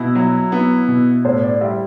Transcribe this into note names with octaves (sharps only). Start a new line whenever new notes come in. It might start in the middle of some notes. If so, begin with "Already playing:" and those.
Already playing: B2 E4
F#3
B3
B2
A2 C5
D5
G3 E5